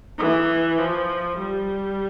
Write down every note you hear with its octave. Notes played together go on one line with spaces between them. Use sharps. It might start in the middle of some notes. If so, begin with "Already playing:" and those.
E3
F3
G3